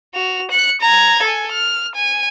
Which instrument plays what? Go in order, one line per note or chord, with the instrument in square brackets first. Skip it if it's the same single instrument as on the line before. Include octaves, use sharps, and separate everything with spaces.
[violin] F#4 F7
F#6 C#7
A#5 G#6
A4 G#5
F6
G#5